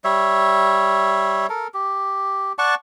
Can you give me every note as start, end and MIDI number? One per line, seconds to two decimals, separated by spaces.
0.04 1.47 55
0.04 1.47 73
0.04 1.47 76
1.49 1.68 69
1.49 1.68 70
1.74 2.53 67
2.58 2.75 74
2.58 2.75 78
2.58 2.75 81
2.58 2.75 85